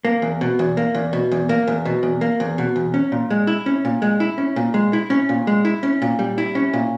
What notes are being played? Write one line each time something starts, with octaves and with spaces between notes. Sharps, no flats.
A#3
E2
B2
E2
A#3
E2
B2
E2
A#3
E2
B2
E2
A#3
E2
B2
E2
C#4
A#2
G#3
E4
C#4
A#2
G#3
E4
C#4
A#2
G#3
E4
C#4
A#2
G#3
E4
C#4
A#2
G3
E4
C#4
A#2